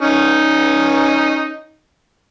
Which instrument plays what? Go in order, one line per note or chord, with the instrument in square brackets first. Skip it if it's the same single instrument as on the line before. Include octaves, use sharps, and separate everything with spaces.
[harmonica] C#4 D#4